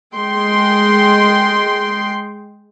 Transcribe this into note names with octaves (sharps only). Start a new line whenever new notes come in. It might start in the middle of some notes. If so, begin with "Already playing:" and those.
G#3 G5 C6